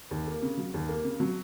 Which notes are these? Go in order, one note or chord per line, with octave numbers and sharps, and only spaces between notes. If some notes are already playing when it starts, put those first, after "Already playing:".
D#2
A#3
C#3
F#3
D#2
A#3
C#3
F#3